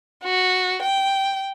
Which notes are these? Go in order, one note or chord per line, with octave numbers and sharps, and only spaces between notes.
F#4
G5